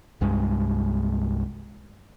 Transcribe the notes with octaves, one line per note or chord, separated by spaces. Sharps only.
C2 G2 G#3